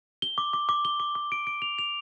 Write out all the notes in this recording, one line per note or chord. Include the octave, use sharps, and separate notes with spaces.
G7
D6
D6
D6
G7
D6
D6
D7
D7
F7
F7